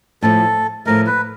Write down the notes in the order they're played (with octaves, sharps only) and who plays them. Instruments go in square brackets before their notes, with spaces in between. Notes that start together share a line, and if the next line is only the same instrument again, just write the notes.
[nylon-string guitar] A2 F3 A3 [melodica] A4
[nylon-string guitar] A2 F3 A3 [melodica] A#4
[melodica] B4